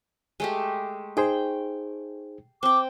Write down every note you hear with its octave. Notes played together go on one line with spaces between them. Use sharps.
G#3 A3 G4
D#4 G#4 C5 G5
C4 G5 D6